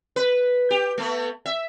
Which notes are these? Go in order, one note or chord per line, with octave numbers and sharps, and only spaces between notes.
B4
G4
A3 B3
E5